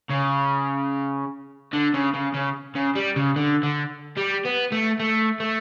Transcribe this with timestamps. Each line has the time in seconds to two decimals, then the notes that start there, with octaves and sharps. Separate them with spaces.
0.10 C#3
1.73 D3
1.94 C#3
2.14 C#3
2.34 C#3
2.76 C#3
2.96 G3
3.16 C#3
3.36 D3
3.63 D3
4.17 G3
4.45 B3
4.72 A3
4.99 A3
5.40 A3